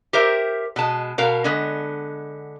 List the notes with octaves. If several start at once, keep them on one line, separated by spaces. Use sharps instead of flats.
G4 A#4 C5 E5
B2 G#3 A5
B2 A#4 F5
D3 G#3 B3